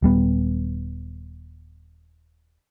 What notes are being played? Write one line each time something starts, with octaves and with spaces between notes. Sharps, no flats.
D#1 G3 B3